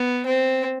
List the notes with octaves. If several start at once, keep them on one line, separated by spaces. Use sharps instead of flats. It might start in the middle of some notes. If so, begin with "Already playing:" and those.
Already playing: B3
C4